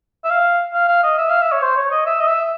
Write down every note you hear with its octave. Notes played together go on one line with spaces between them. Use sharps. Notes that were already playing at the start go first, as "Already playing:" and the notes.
E5
F5
F5
F5
D#5
E5
F5
E5
C#5
C5
C#5
D#5
E5
D#5
E5